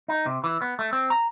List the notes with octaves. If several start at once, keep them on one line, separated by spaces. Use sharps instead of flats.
D#4
C3
E3
B3
A3
C4
A#5